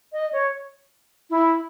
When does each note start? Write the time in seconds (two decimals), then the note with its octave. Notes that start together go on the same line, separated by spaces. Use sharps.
0.13 D#5
0.33 C#5
1.30 E4